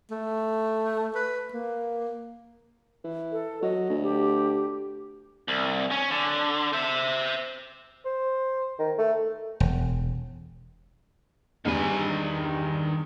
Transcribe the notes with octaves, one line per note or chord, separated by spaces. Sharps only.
A3
B4
A#3
E3
A4
F#3 D#5
D2
G4
C2
C#4
D3
C5 E5
C5
D#3
A3
E1
E2 G2 D#3 G3 G#5